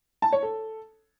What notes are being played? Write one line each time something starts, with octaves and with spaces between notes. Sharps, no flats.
A5
C#5
A4